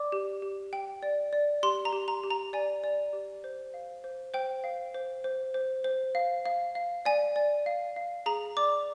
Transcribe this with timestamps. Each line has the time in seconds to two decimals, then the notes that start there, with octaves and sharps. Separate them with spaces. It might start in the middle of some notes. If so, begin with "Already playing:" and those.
Already playing: D5 D6
0.12 G4
0.42 G4
0.73 G5
1.03 D5
1.33 D5
1.63 G4 C6
1.85 A#5
1.92 G4
2.08 A#5
2.24 G4
2.30 A#5
2.53 D5 G#5
2.84 D5
3.13 G4
3.44 C5
3.74 F5
4.04 C5
4.34 C5 G5
4.64 F5
4.94 C5
5.24 C5
5.54 C5
5.84 C5
6.15 F5
6.46 F5
6.75 F5
7.05 D5 G#5
7.36 D5
7.66 F5
7.96 F5
8.26 G#4 A#5
8.57 D5 D6